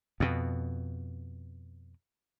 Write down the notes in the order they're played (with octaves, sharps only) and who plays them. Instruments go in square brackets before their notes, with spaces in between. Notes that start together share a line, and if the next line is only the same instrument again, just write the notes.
[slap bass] F2 B2